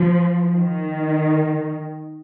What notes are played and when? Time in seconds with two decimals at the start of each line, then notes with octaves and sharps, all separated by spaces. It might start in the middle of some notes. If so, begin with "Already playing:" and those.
Already playing: F3
0.51 D#3